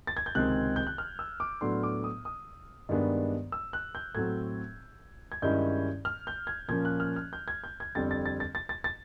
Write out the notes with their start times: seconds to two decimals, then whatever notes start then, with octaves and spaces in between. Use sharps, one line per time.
0.07 A6
0.17 G#6
0.26 G6
0.35 C#2 C3 D#3 G#3 C4 F#6
0.76 G6
0.87 F#6
0.98 F6
1.19 E6
1.40 D6
1.61 A2 F#3 B3 D4 C6
1.83 D6
2.04 D#6
2.25 D#6
2.89 G2 D#3 G#3 B3 D4
3.52 E6
3.73 F#6
3.95 G6
4.15 A2 F#3 A3 C4 G#6
5.32 G#6
5.42 G2 D#3 G#3 C#4 E4 G6
6.05 F6
6.27 G6
6.47 G#6
6.68 A#2 F3 A#3 C#4 G#6
6.85 F#6
7.00 F6
7.16 F6
7.33 G6
7.48 G#6
7.64 G6
7.80 G#6
7.95 F2 D3 G3 C4 A6
8.11 A6
8.26 A6
8.40 A6
8.55 A6
8.69 A6
8.84 A6